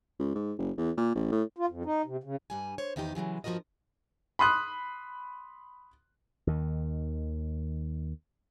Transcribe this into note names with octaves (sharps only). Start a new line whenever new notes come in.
C#2
G#2
F#1
E2
A#2
A1
A2
F4
F2
D#4
C3
C#3
G2 G3 G#5
C5 C#5
E2 D#3 F3 D#4 G4
C#3 E3 F#3 G#3
G2 F3 C#4 F#4 A#4 D#5
B5 C6 D#6 F#6
D#2 D#3